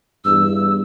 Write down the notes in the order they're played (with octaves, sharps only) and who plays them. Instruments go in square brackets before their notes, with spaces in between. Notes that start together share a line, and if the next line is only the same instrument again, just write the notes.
[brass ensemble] E2 G2 [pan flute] E6